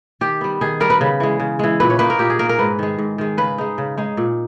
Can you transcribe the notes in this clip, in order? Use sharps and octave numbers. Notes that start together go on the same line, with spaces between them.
D#3 G4
G3 B3
D#3 G#4
G3 B3 A#4
B4
C#3
E3 G#3
C#3
E3 G#3
A#2 B4
C#5
A#3 D#4 B4
A#4
A#2 G4
G#4
A#3 D#4 A#4
A#4
G#2 B4
D#3 G#3
G#2
D#3 G#3
C#3 B4
G#3 D#4
C#3
G#3 D#4
A#2